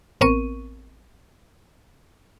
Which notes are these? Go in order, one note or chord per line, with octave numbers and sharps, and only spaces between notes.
A1 B3 C4 A#4 C#6 D#7